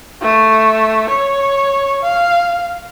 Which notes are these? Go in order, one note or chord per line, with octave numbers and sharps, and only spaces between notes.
A3
C#5
F5